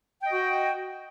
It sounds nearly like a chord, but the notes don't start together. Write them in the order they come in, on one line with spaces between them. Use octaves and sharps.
G5 D#5 F#4